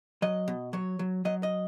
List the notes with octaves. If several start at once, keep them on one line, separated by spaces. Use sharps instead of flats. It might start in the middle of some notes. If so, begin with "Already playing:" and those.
F#3 D#5
B2
F#3 C#5
F#3
F#3 D#5
D#5